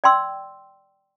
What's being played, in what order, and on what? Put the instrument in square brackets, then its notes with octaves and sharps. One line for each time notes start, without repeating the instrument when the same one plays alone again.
[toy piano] D5 G5 C6 E6